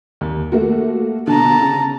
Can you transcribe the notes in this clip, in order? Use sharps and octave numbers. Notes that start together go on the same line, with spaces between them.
D#2
A3 A#3 F#4
B2 D3 A5 A#5
C#3